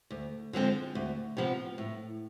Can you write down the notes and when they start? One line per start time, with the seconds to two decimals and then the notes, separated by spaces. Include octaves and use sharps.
0.10 D2
0.53 D3 F3 G#3 C4
0.95 D2
1.37 C3 F3 B3
1.78 A2